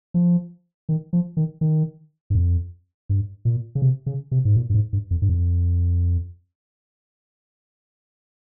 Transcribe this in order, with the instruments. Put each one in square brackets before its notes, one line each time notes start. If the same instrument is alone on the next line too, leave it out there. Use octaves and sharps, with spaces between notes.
[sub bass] F3
D#3
F3
D#3
D#3
G2
F2
G2
A#2
C#3
C3
C#3
C3
G#2
A#2
G2
G#2
G2
F2
G2
F2